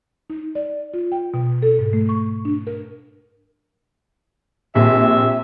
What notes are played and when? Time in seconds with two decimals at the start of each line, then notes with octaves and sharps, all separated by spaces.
0.30 D#4
0.55 D5
0.94 F4
1.12 G5
1.34 B2
1.62 A4
1.79 G#2
1.93 A3
2.09 C#6
2.45 D4
2.67 A#4
4.75 A#1 C3 E5